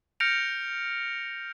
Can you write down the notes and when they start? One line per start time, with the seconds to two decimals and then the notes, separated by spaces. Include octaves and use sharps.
0.20 F6 G6 A#6 C#7 D7 F7